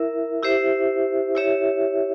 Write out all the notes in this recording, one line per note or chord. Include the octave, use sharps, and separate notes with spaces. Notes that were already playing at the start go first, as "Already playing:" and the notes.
Already playing: E4 A#4 E5
E4 G4 C5 E5
E4 G4 C#5 E5